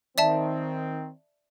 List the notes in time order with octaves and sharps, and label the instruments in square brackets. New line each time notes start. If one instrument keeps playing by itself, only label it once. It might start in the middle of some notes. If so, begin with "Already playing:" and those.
[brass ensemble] D#3 C4 [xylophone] D5 E5 A5